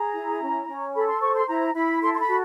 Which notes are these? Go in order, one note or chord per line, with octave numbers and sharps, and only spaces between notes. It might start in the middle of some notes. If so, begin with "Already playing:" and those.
Already playing: G#4 A#5
E4
C#4
C#4
A4 B5
C6
C5 C#6
C6
E4 A#5
E4 B5
A4 C6
C6
B5
F#4